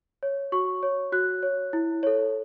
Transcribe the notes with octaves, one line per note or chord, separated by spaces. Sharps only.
C#5
F#4 C#6
C#5
F#4 F#6
C#5
E4
A4 C#5